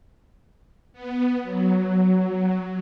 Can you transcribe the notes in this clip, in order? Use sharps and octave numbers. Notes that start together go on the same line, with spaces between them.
B3
F#3